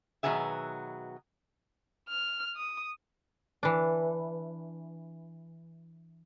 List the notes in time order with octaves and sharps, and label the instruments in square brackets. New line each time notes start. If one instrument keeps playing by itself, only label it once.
[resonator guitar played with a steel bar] B2 D#3 F#3 B3 G#4 E5
[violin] F6
D#6
[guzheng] E3 D4